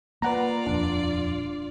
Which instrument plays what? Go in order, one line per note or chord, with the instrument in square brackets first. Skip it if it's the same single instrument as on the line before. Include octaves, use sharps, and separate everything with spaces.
[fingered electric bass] A#3 [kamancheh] F4 D5 [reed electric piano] B4 F#5 A#5
[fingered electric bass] D#1 F2 [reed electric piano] D4